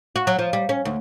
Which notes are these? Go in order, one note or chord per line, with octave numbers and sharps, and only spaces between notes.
F#4
F#3
F3
G3
C#4
D2